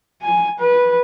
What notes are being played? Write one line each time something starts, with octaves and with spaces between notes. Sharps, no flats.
G#5
B4